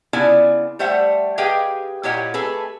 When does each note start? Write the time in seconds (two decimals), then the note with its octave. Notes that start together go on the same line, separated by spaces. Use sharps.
0.13 C#3 B3 E4 F4 D5 G#5
0.79 G3 A3 C5 E5 F#5
1.38 G4 G#4 B4 D#5 F5 G5
2.03 A#2 E4 G4 C#5 D#5 F#5
2.34 A3 G#4 A4 B4